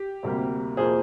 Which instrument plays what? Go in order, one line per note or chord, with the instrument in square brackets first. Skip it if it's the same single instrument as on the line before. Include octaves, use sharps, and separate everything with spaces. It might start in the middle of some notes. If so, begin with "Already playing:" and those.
Already playing: [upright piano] G4
D2 C3 G3 A#3
F2 C3 F3 A#3 G#4 C5